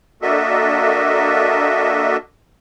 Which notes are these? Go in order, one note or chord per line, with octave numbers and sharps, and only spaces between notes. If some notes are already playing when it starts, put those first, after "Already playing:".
A#3 D4 F#4 A4 D#5 E5